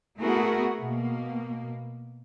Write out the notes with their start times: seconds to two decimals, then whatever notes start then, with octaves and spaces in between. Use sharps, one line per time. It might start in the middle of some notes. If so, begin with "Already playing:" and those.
0.20 A3 B3 E4 F#4 G#4 A#4
0.79 B2 A#3